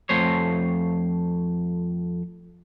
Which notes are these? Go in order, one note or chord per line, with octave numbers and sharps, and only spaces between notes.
F2 A3 C5 C#5